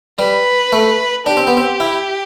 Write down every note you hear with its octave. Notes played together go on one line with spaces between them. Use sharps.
G3 B4
A3
D4 G4
C4
B3
C4
E4